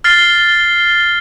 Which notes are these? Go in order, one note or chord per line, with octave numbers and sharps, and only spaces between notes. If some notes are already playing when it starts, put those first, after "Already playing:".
F6 A6 C7 G7